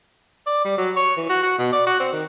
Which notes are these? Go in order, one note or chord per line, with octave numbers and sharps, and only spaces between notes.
D5
G3
F#3
C#5
E3
F#4
F#4
B2
D5
F#4
C4
D#3